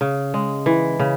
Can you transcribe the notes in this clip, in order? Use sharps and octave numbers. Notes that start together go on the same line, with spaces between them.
C#3
G#3
E3
C#3